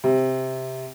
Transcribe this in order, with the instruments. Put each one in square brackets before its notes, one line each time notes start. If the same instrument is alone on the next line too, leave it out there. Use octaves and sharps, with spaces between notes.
[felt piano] C3